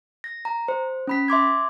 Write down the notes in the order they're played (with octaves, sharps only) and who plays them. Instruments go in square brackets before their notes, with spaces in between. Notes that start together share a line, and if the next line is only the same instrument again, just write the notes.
[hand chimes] A#6
A#5
C5
C#4 B5 B6
E5 C6 D6 G#6